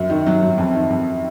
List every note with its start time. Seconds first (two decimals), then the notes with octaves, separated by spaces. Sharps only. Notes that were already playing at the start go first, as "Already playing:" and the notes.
Already playing: F#2
0.10 D#3
0.26 F#3
0.42 F#2
0.58 F2
0.75 D#3
0.91 F2